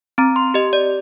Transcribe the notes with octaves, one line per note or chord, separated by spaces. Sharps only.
C4 A#5
C6
G4 D#5
D5